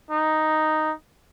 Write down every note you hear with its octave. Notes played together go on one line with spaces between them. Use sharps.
D#4